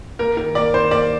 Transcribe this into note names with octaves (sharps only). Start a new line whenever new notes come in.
A#3 A#4
D#3 A#4
A#3 D5
D#3 C5
A#3 D5